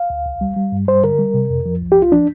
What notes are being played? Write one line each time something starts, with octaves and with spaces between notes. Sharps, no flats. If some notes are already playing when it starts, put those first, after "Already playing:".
Already playing: F5
D2
C2
G3
G3
G2
G3 C5
D3 A#4
G3
C3
F2
F3
C2
G4
C2 F4
F3 D4